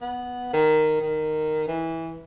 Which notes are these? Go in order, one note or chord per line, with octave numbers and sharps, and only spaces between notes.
B3
D#3
D#3
E3